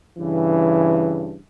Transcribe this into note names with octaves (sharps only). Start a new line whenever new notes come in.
G2 C#3 E3